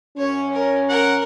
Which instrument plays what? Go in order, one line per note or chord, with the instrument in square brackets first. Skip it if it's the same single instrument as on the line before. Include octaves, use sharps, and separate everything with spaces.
[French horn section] F#2 C#4 [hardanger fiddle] C#5
[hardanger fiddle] A#4
[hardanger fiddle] A#4 [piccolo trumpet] F#5